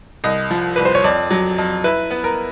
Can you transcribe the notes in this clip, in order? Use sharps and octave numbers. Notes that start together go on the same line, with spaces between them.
C2 D#5
F3
C2 B4
C5
C#5
F2 D5
F#3
F2
E4 B4
B3
A#4